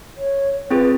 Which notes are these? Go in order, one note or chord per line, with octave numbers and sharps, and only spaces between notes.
C#5
C4 F4 G#4 B4